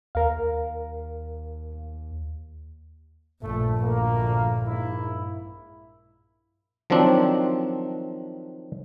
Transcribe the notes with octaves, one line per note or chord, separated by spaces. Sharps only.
D#2 A#4 F5
A#1 G2 A3
D2 A3 A#3
G#2 A#3 E4
D#3 F3 F#3 C4 D4